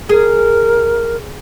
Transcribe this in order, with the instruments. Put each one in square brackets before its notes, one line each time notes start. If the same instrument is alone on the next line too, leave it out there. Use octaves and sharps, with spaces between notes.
[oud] G#4 [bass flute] A#4